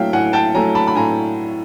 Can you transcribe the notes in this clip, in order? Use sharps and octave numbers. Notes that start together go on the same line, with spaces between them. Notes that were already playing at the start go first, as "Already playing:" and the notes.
Already playing: A2 F#3 A3 E5 F5 G5
A2 F#5 G#5
G5 A5
F#3 A3 G#5 A#5
A5 B5
B5
A2 G#5 A#5